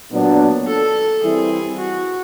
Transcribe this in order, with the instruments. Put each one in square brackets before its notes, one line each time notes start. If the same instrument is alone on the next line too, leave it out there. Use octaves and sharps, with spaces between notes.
[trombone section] A#2 F#3 B3 D4
[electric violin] A4
[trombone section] E3 G3 C4 E4 [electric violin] G#4
[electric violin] F#4